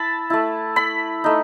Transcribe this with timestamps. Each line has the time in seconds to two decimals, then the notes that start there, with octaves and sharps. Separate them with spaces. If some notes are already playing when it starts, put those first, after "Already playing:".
Already playing: E4 A5 B5
0.30 A3 E4
0.76 B5
1.24 A3 D#4